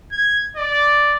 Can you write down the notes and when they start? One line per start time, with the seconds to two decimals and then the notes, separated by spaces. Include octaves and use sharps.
0.12 G#6
0.57 D5